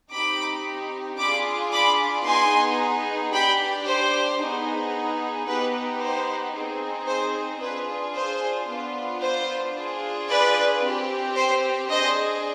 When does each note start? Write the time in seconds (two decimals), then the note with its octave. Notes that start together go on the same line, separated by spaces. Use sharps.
0.11 C4 D#4 G4 B5 D6
1.18 D4 F4 G#4 B5 D6
1.72 B5 D6
2.26 B3 D#4 G#4 G#5 C6
3.33 D4 G4 G5 B5
3.86 C5
4.40 B3 D#4 G#4
5.47 B3 D#4 G4 B4
6.01 C5
6.54 C4 D#4 G#4
7.07 C5
7.61 D4 F4 G#4 B4
8.14 C5
8.68 B3 D4 F4
9.21 C5
9.76 D4 F4 G#4
10.29 B4 D5
10.82 C4 G4
11.36 C5
11.89 D4 G#4 C5 D#5